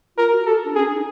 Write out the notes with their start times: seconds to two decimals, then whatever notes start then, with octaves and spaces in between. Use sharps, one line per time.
0.18 F4 A#4
0.32 F#4
0.46 G4 A4
0.65 D4
0.75 C#4 G#4
0.85 D4
0.94 D#4